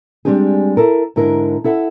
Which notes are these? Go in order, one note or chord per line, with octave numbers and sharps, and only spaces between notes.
G3 G#3 C4 D4 G4 G#4
E4 A4 A#4
G#2 D3 E4 A#4
E4 A4 E5 F#5